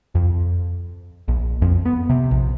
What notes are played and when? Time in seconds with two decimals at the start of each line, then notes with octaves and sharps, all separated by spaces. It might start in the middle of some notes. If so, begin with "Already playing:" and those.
0.15 F2
1.28 A#1
1.62 F2
1.85 B3
2.09 C3
2.31 A#1